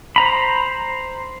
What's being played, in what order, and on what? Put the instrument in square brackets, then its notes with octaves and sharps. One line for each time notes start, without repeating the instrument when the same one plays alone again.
[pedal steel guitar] C5 A#5 B5